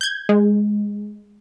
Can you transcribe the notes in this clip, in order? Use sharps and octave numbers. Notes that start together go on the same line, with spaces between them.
G6 G#6
G#3